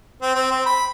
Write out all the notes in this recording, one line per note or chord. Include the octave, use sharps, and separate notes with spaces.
C4
C4
C4
B5